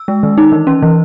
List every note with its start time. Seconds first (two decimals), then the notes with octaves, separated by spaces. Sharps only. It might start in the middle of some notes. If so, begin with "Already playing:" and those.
Already playing: E6
0.08 G#3
0.23 D#3
0.38 D#4
0.52 E3
0.67 C#4
0.83 E3